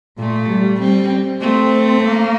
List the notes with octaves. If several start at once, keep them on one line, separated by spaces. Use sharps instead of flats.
A#2 A3
G3
G3 C4
A3 C4
A#3